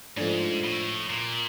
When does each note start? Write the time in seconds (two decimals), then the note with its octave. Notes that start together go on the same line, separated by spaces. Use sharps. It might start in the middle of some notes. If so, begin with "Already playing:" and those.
0.17 G#2 F3 A3 D4
0.64 A2
1.09 A#2